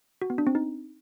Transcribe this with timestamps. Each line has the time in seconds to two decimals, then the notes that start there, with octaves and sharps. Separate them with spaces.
0.22 F#4
0.30 B3
0.38 D4
0.47 C4
0.55 D#4